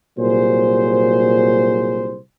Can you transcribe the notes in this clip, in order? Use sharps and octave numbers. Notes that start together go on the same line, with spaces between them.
C2 A#2 F#3 G#4 C5